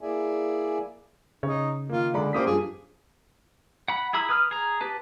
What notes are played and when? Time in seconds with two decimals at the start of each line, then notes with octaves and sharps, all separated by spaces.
0.01 A#3 E4 G#4 D5 E5 G#5
1.43 C#3 D#4 C#5
1.89 D#3 A#3 F4
2.14 D3 G#3 D5 B5
2.33 A#3 C#4 G4 C5 D6 D#6 B6
2.46 G2 F3 G#4
3.88 F#5 B5
4.13 E4 G#4 A#5 B5 E6
4.29 B4 D#6 F6
4.51 G#4 A#5
4.81 G4 B4 A5